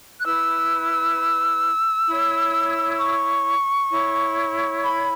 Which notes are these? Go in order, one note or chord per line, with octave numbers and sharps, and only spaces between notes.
F#6
E4 B4 E6
E4 C#5
C#6
E4 C#5
B5